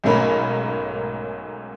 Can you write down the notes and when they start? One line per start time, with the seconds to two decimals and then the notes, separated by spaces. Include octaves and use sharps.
0.04 B1 G#2 A3 C#4 A#4 B5